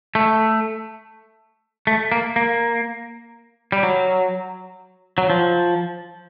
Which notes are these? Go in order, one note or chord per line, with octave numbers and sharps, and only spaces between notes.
A3
A3
A#3
A#3
G3
F#3
F#3
F3